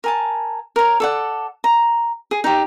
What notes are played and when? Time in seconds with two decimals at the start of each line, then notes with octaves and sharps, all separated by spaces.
0.04 A#4 G#5 A5
0.76 A#4 C#5
1.00 A4 D5 F#5
1.64 A#5
2.31 G#4
2.44 D#4 G4